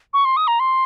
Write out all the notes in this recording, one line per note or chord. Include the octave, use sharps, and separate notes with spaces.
C#6
C6
D#6
A#5
C6